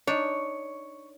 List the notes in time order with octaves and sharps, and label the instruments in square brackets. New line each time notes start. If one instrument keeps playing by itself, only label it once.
[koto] D4 D#4 [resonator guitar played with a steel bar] C#5